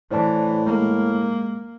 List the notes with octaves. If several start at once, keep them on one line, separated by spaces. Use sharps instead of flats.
A2 E3 C5 D5 A5
G#3 A#3